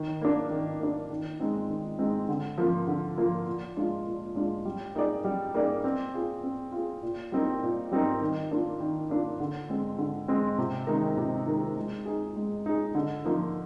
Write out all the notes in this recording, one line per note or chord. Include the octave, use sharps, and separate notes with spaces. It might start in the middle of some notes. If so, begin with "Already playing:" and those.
Already playing: D#3
A#3 D4
D#3
A#3 D4
D#3
G#3 C4 D#4
D#3
G#3 C4 D#4
D3
F3 A#3 F4
D3
F3 A#3 F4
A#2
G#3 D4 F4
A#2
G#3 D4 F4
G3
A#3 D#4 G#4 D5
G3
A#3 D#4 G#4 D5
C4
F4 G#4
C4
F4 G#4
A#2
G3 C4 D#4 A#4
A#2
G3 C4 D#4 A#4
D#3
A#3 D4 F4
D#3
A#3 D4 F4
D3
G#3 C4
D3
G#3 C4
C3
D#3 G#3 D#4 A#4
C3
D#3 G#3 D#4 A#4
G#3
D#4 G#4
G#3
D#4 G#4
D3
F3 A#3 D#4